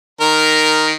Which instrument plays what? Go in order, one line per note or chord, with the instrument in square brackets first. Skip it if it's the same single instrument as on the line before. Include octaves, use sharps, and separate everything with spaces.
[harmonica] D#3 A#4